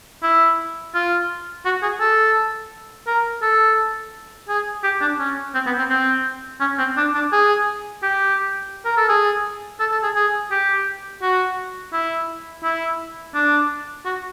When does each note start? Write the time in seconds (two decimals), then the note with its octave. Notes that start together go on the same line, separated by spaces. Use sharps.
0.23 E4
0.95 F4
1.65 F#4
1.82 G#4
2.00 A4
3.07 A#4
3.42 A4
4.49 G#4
4.84 G4
5.01 D4
5.19 C#4
5.55 C4
5.66 B3
5.78 C4
5.90 C4
6.60 C#4
6.79 C4
6.97 D4
7.15 D4
7.33 G#4
8.03 G4
8.85 A#4
8.97 A4
9.09 G#4
9.80 A4
9.92 A4
10.04 G#4
10.16 G#4
10.51 G4
11.22 F#4
11.93 E4
12.64 E4
13.35 D4
14.05 F#4